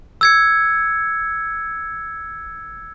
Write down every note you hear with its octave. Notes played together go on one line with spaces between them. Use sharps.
E6 G#6 C#7